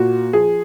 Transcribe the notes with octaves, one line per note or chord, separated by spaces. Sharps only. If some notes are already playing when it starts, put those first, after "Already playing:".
Already playing: A#2 F#4
F3 G#4